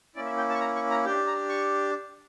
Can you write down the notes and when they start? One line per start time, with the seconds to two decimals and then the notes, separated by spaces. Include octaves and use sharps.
0.15 A#3 C#4 E4 D5
0.26 E5
0.37 G5
0.49 A5
0.54 C#6
0.60 A#5
0.76 C#6
0.90 A#5
1.05 D4 G4 G5
1.27 A#5
1.49 C#6